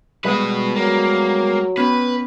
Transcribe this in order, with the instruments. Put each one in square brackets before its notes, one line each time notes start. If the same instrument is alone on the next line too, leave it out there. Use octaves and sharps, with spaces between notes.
[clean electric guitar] G3 G#3 B3 [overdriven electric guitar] F#4 B4
[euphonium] F#3 [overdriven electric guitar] A#3
[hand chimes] B3 C#4 B5 [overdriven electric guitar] B4